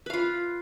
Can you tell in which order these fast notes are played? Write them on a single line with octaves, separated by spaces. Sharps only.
B4 F5 F4